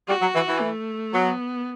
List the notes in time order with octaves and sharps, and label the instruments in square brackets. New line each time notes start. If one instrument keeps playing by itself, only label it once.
[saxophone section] G3 [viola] F#4
[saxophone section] F#3
E3
E3
[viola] A3
[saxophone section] F#3 [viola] B3